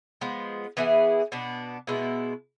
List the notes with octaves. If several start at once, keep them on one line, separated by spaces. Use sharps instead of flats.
F3 G#3 B3
E3 B3 E4 G#4
B2 B3 D4
B2 G#3 B3 E4